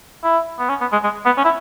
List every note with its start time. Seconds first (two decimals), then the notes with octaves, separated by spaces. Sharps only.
0.24 E4
0.59 B3
0.69 C#4
0.81 B3
0.92 G#3
1.04 G#3
1.26 B3
1.38 C#4
1.45 E4